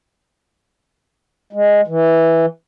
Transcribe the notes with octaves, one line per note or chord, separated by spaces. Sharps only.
G#3
E3